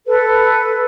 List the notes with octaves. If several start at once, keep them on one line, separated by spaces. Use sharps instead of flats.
A4 B4